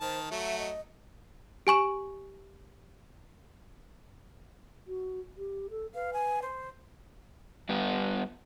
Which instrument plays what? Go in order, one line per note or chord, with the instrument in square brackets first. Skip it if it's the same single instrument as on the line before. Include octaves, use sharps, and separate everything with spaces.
[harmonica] D#3 A5 [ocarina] C5
[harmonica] F#3 A3 F#4 [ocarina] E5
[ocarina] D#5
[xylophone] G4 G#5 C#6 E7
[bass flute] F#4
G4
A4
[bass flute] B4 [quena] F5
[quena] G#5
C5
[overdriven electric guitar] G2 B3